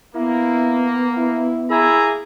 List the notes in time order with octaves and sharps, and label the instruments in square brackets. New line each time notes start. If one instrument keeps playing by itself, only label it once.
[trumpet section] A#3 [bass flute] B3 [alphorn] E4
[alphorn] E4
[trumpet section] A#3 G#5 A#5 [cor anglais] E4 [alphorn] G#4